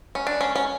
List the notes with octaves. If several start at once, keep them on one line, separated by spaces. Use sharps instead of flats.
C#4
D4
C#4
C#4